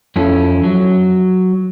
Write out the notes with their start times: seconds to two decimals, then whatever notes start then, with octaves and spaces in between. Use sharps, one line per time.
0.16 F2 C#4 E4 A4
0.64 F#3